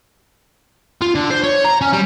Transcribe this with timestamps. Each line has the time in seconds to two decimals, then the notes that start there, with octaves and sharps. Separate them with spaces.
1.01 F4
1.15 D3
1.31 C5
1.44 C#5
1.65 A#5
1.81 C#4
1.93 G3